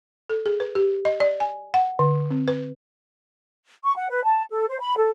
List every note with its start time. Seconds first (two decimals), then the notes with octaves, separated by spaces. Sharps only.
0.29 A4
0.46 G#4
0.60 B4
0.75 G4
1.05 D#5
1.20 D5
1.40 G#5
1.74 F#5
1.99 D3
2.31 C4
2.48 B4
3.84 C#6
3.96 F#5
4.10 B4
4.24 A5
4.50 A4
4.68 C5
4.80 B5
4.97 A4